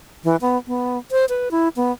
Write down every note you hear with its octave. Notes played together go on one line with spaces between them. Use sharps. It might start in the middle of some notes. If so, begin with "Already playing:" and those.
E3
B3
B3
C5
B4
E4
B3